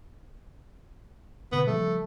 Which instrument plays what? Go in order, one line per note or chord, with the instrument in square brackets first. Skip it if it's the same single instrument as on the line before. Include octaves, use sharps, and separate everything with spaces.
[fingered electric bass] B2 D3 [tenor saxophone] B3
[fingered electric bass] C#3 F3 G3 [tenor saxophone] A3